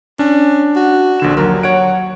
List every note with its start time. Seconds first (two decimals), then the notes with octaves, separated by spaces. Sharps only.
0.19 C#4 D4
0.76 F#4
1.20 A#1 D3 E7
1.37 D#2 F#3 A#4
1.63 C#5 F#5 D7